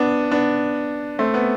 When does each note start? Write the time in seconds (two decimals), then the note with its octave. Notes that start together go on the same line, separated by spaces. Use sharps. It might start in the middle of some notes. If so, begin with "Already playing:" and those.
Already playing: B3 D4
0.31 B3 D4
1.19 A3 C4
1.34 B3